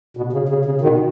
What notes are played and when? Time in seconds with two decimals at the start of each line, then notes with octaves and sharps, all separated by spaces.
0.17 B2
0.33 C#3
0.49 C#3
0.65 C#3
0.81 B2 D#3